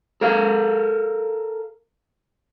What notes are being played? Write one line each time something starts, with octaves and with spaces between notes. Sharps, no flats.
A4 A#4 F5